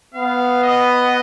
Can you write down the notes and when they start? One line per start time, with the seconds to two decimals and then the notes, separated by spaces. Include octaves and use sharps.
0.14 B3 F5
0.63 D#5